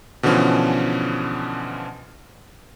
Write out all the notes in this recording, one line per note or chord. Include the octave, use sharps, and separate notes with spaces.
B2 D3 E3 F3 C#4